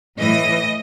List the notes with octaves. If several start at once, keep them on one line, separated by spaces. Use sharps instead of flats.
A2 E3 D#5